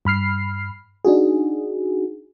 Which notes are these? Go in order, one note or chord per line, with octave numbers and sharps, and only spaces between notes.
G2 B5 F6 C7
D4 D#4 F#4 G#4